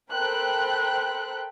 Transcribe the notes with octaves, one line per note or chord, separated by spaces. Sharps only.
A4 A#4 C5 G5 B5 F#6